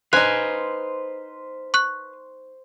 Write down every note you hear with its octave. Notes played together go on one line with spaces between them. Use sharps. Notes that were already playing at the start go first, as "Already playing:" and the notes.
D#4 B4 C5 F5 G#5 F#6
C#6 F#6